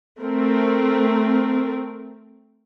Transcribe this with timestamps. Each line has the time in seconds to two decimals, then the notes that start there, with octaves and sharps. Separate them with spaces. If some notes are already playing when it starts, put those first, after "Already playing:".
0.19 A3 C4 A#4